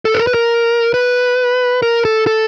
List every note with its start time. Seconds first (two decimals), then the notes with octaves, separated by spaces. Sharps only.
0.05 A4
0.14 B4
0.19 A#4
0.27 B4
0.34 A#4
0.94 B4
1.82 A#4
2.05 A4
2.27 A4